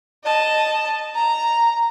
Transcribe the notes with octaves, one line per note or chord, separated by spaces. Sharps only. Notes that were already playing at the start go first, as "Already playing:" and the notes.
D#5 A5
A#5